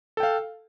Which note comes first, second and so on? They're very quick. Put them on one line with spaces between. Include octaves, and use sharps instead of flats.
A4 G5 F5